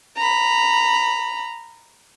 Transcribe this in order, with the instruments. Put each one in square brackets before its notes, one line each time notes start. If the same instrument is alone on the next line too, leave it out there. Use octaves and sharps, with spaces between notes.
[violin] A#5 B5